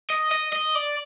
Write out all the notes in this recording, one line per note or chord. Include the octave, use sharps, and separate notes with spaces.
D#5
D#5
D#5
D5